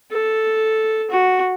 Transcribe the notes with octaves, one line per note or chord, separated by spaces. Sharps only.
A4
F#4